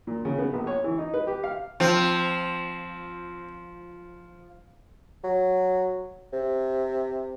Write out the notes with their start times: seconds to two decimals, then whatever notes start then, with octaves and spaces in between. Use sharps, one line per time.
0.07 A#2
0.25 C#3
0.38 B3
0.53 A#1
0.67 C#5
0.84 E3
0.98 D#4
1.14 B4
1.27 G4
1.44 F5
1.80 F3 C4
5.24 F#3
6.33 C3